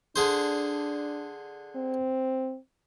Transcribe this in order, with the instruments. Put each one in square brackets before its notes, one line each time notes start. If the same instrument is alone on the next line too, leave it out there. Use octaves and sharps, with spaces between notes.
[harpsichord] D3 G#4 C5 [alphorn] D4
[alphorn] C4